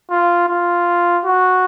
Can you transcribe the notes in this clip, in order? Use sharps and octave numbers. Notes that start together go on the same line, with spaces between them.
F4
F4
F#4